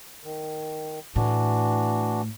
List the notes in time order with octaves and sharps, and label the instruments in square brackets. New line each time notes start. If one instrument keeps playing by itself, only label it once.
[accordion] D#3
[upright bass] A2 [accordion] E3 D4 F#4